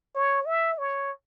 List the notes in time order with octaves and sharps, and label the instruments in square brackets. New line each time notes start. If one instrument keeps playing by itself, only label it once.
[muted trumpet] C#5
E5
C#5